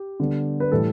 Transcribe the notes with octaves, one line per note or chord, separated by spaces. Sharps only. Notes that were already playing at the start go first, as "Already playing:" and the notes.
Already playing: G4
D3 G3 B3
B4
A2 E3 G3 A4